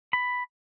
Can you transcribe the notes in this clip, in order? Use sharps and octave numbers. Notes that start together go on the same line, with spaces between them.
B5